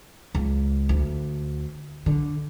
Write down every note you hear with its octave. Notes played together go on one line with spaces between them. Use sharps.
C#2
D2
D3